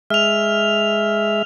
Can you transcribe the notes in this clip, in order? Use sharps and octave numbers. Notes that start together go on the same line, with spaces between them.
G#3 E5 F6 F7